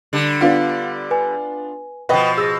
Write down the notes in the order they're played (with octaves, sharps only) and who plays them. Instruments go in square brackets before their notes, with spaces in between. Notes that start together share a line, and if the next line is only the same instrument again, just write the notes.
[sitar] D3 G3
[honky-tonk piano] B3 D4 F4 [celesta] F5 F#5
[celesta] B4 G#5
[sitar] B2 F3 [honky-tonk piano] B4 D#5 [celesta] F#5 G5
[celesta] G#4 A#6 [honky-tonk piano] E6